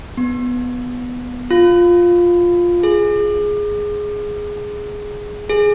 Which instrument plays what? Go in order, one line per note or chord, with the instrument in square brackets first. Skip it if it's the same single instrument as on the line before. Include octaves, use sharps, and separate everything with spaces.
[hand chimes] B3
F4
G#4
G#4